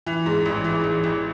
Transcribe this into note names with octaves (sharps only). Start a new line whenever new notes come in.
E3
G#2
A1
E3
A1
A1